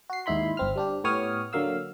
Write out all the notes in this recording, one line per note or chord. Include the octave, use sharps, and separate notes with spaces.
F#4 C7
D#2 G#2 D#4 E4 B5 C6
G1 C4 F6
G3 D4 G4
A2 B3 G4 C#5 D#6 F6
D3 F#3 A#3 F5 E6